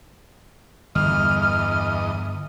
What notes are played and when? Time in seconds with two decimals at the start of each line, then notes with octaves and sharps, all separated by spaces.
0.95 G1 E2 D#5 F6